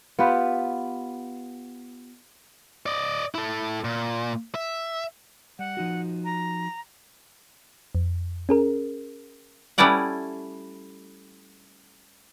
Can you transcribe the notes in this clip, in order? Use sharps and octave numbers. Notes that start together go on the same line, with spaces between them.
B3 F4 G4 B4
D5 D#5
E4 A4
A#2
E5
G3 F#5
F3 D#4 F#4
A#5
F2
C#4 G#4 A#4
G3 A3 C#4 E4 D5 F#5